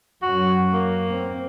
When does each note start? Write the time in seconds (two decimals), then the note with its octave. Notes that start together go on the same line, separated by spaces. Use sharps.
0.22 F#2 F#4
0.72 A#3
1.09 C4